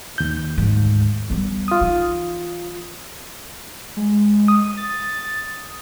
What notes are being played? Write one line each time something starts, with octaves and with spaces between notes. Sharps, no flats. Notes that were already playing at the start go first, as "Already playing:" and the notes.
D#2 G6
D2 G#2
G3 B3
F4 D#6
E3 D#4
G#3
D#6
A6